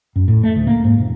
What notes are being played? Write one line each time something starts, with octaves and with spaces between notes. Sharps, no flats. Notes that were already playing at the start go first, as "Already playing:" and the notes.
F#2
A2
A3
D2
A#3
G#2
E1